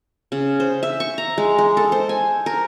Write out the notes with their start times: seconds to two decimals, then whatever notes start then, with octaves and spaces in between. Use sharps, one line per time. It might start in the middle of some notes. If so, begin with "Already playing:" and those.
0.32 C#3
0.60 C5
0.83 E5
1.00 C#6
1.18 A#5
1.38 G#3
1.58 G#3
1.77 A4
1.92 C5
2.09 G#5
2.46 A#4